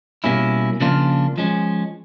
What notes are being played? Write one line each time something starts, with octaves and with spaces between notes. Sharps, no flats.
B2 G3 A#3 C#4 E4
C#3 F3 A#3 D4 F4
F3 G#3 C#4